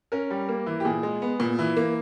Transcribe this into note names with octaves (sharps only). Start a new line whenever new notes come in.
C#4 A#4
G3
A#3
E3
G4
A#2 G#4
G#3
B3
A#2
E3
A#3